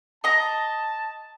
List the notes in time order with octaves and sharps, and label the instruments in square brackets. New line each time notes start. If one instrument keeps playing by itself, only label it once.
[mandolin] D#5 A#5 [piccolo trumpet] A5